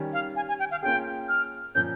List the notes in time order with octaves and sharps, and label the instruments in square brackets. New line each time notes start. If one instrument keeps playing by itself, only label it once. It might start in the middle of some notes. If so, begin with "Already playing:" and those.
Already playing: [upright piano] D#3 G3 C#4 G4
[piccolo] F5
G#5
G#5
G5
F5
[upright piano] A#3 C#4 F4 G#4 [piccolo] G5
[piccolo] F6
[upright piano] A#2 F3 A#3 C#4 [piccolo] G6